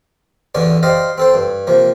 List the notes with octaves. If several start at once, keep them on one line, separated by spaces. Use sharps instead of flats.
A1 E2 D3 C#4 D5
G4 C5 D5 D#5 F5
C4 A4 C5
G2
C3 F3 A#3